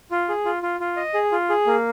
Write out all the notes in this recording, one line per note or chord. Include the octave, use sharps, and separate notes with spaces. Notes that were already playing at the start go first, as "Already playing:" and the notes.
F4
G#4
F4
F4
F4
D#5
G#4
F4
G#4
A#3